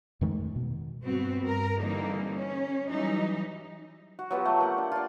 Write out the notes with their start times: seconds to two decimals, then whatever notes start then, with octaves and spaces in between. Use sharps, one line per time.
0.21 F2 D#3 G#3 A3
0.56 B2
1.03 G2 B3 C4 F#4
1.42 G2 A#4
1.81 D3 E3 G3 A#3 C4 D#4
2.34 C#4
2.90 E3 F#3 G3 D#4
4.19 F#4
4.31 F#3 B3 F4 G4
4.45 A3
4.60 A#3 F#5 G5
4.78 D4
4.92 F4 D5